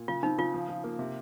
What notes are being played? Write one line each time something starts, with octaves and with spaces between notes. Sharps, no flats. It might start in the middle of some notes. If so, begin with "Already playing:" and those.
Already playing: A#2
C#3 F4
C4 D#4
C#3 F4
F3
F3
A#3
C3